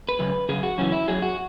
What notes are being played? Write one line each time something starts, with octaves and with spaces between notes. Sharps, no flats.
B4
F#2 C#3
F#2 C#3 G#4
F#4
F#2 C#3 E3 C#4
E4
F#2 F#3 G#4
F#4